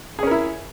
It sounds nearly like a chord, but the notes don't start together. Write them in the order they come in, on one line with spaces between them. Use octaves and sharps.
G#4 C#4 A#4 E4